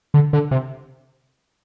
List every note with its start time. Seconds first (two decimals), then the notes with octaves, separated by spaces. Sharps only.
0.14 D3
0.33 D3
0.51 C3